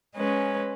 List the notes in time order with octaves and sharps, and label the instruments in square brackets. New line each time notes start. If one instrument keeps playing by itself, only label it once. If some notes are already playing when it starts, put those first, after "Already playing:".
[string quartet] G#3 C#4 B4